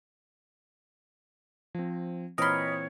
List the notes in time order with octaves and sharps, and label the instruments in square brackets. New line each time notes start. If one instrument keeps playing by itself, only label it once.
[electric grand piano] F3 C4
[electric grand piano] A#2 E3 C4 [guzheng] A#4 C6 [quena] C#5 [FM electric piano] D#5 B5